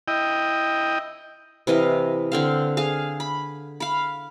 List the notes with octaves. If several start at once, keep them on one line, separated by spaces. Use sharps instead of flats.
E4 D#5 G5
C3 E3 D#5 F5
D3 C4 F5
G#4 F5
B5
F5 B5